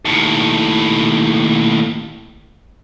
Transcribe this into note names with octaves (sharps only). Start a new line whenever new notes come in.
D#2 A2